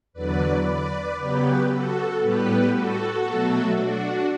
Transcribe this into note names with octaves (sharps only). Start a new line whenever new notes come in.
E2 D3 F#3 B4 D5
B4 D5
C#3 F#3 B3 G4 B4
F#4 A4
A2 G3 B3 G4 B4
F#4 A4
B2 F#3 A3
D4 F#4